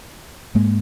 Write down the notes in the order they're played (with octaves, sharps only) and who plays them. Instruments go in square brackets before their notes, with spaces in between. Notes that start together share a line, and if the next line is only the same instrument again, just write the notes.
[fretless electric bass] G#2 G#3 A#3